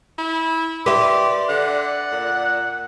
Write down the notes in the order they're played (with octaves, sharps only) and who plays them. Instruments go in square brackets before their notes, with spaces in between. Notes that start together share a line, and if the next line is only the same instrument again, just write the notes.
[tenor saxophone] E4
[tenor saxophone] G4 [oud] B4 E5 [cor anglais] D5 [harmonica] C6
[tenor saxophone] D3 [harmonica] F#5
[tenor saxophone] A#2